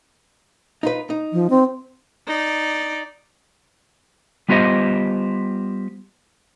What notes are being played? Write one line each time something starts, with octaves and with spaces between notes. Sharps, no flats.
D#4 F4 B4
D#4
F3
C4
D#4 D5
G3 B3 F4 G4 C5 D#5